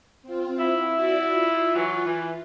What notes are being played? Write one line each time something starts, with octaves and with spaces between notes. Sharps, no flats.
C4 F4
E4
F#4 D5 E5
F4
E3 F#3
E3